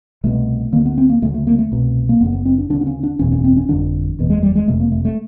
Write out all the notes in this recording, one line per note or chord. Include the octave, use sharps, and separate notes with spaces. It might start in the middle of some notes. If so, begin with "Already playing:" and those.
C2 B2 A3
D2 D3 A#3
B3
C4
A#3
D2 C#3 A3
A3
A#3
A3
C2 B2
A#3
F#1 F#2 C#3 B3
B3
C4
D4
D2 C#3 D4
D4
C#4
D4
F#1 E2 B2 C#4
C#4
C4
C#4
G1 F2 D3 D4
F#1 E2 B2
G#3
G3
G#3
F#1 F2 C3 A3
A#3
A3
A3